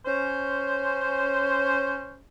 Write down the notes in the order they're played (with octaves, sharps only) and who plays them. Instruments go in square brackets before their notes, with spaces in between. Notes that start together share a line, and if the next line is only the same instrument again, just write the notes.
[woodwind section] C#4 C5